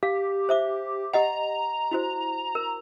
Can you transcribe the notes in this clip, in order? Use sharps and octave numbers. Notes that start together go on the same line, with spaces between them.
G4 F5
C5 E5 D6
G4 D#5 F#5 A#5
E4 F#4 C5
A#4